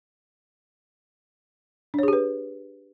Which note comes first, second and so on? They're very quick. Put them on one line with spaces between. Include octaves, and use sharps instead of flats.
D4 C#5 G#4 G4 B4